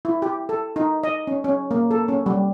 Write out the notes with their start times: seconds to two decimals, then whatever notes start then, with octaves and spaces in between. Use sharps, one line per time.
0.05 E4
0.22 G4
0.49 A4
0.76 D#4
1.04 D#5
1.27 C#4
1.44 C#4
1.71 A#3
1.91 A4
2.08 C#4
2.26 G3